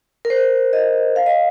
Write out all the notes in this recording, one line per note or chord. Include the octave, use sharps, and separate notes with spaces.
A#4
C5
D#5
F5
D#5